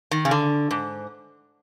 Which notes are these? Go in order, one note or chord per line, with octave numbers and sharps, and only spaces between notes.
D#3
C#3
D3
G#2